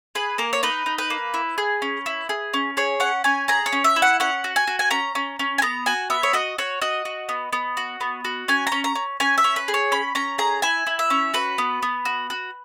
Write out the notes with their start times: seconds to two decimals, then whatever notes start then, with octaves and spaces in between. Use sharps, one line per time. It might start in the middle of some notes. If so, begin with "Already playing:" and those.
0.15 G#4 B4
0.38 A#3 A#4
0.53 C#5
0.63 D#4 B4
0.86 D#4
0.98 B4
1.10 A#3
1.34 E4
1.58 G#4
1.82 C#4
2.06 E4
2.29 G#4
2.54 C#4
2.77 G#4 C#5
3.00 C#4 F#5
3.24 C#4 G#5
3.48 G#4 A#5
3.66 C#5
3.72 C#4
3.84 E5
3.96 E4
4.02 F#5
4.20 C#4 F#5
4.44 F#4
4.56 G#5
4.67 F#4
4.79 G#5
4.91 C#4 A#5
5.15 C#4
5.39 C#4
5.58 G#5
5.62 B3 A#5
5.86 F#4 G#5
6.10 B3 E5
6.23 C#5
6.33 F#4 D#5
6.58 F#4 C#5
6.81 F#4 D#5
7.05 F#4
7.29 B3
7.53 B3
7.77 F#4
8.01 B3
8.25 F#4
8.48 C#4 G#5
8.67 A#5
8.72 C#4
8.84 A#5
8.95 C#4
9.20 C#4 G#5
9.38 E5
9.44 C#4
9.56 B4
9.68 G#4
9.74 C#5
9.92 C#4 B5
10.15 C#4 A#5
10.38 G#4 A#5
10.62 E4 G#5
10.87 E4
10.99 E5
11.10 C#4
11.34 F#4 B4
11.58 B3
11.82 B3
12.05 F#4
12.30 F#4